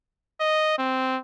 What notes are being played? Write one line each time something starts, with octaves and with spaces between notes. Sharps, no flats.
D#5
C4